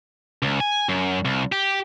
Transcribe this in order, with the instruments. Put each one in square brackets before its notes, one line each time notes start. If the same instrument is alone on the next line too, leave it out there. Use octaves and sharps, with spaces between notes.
[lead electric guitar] C#2
G#5
F#2
C2
G4